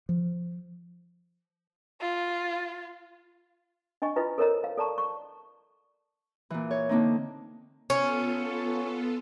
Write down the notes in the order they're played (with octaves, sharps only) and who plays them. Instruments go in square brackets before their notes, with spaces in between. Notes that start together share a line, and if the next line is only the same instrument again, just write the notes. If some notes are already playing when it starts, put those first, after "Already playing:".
[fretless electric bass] F3
[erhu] F4
[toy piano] D4 D#5 G#5 C#6
D4 E4 F4 B4 D#5
A4 A#4 C5 C#5 D#5 A#5
F5
A4 D5 A5 A#5 C#6
C#6
[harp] A#2 E3
C#5
D3 A#3 C4 D#4
[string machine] B3 F4 A4 [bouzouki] C#4